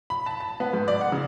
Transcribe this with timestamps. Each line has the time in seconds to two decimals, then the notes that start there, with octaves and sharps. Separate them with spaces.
0.10 B5
0.26 A5
0.40 A5
0.60 B3
0.73 G#2
0.88 D5
1.01 F#5
1.12 C#3